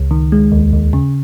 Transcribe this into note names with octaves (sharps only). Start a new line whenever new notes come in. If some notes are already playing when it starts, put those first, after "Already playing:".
Already playing: C#2
D#3
G#3
D#2
D#2
C#3